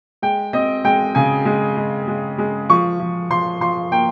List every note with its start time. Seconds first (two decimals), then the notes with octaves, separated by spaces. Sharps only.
0.22 G#3 G5
0.53 C4 D#5
0.85 G#3 G5
1.15 C#3 G#5
1.45 G#3
1.77 G#3
2.08 G#3
2.38 G#3
2.70 F3 C#6
3.00 F3
3.30 F3 C6
3.61 F3 C6
3.92 A#3 G5